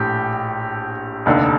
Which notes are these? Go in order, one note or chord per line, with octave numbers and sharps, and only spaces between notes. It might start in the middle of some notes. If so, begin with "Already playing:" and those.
Already playing: A#1 A2 G4
F1 D#2 D3